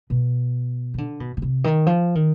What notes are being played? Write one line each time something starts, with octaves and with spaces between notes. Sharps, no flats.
B2
D#3
D3
B2
B2
C3
D#3
F3
D#3